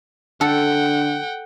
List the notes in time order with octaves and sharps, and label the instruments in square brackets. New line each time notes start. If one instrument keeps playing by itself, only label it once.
[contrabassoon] D3 [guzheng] A4 [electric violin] F#5 G5